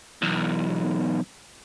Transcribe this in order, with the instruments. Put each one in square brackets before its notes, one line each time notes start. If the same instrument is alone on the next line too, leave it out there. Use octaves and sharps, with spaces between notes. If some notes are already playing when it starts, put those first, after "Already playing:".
[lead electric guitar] B1 E2